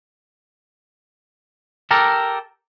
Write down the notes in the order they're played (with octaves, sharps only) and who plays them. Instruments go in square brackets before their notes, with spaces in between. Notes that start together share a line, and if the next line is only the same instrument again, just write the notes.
[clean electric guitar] G4 A4 A#4